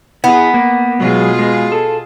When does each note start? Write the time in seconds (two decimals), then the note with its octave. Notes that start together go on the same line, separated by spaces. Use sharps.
0.24 B3 E4 G#4
0.54 A#3
1.00 B2 F#3 G#3 F4 G#4
1.39 G#3
1.72 A4